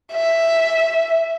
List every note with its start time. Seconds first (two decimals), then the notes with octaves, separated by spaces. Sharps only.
0.12 E5